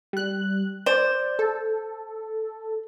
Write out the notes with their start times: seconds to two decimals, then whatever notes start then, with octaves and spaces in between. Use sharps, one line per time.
0.13 G3 F#6
0.86 C5 D5
1.39 A4